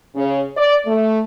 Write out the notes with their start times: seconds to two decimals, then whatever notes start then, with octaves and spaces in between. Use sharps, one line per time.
0.15 C#3
0.57 D5
0.86 A3